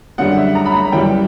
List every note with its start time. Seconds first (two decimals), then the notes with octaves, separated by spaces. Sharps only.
0.18 F#2 D3 G3 F#5
0.37 E5
0.55 A#5
0.66 B5
0.74 A#5
0.92 F#2 E3 G3 G5